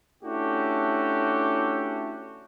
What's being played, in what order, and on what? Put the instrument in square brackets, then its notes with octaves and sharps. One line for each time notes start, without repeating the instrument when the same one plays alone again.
[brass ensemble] A3 C#4 D4 E4 F#4 G4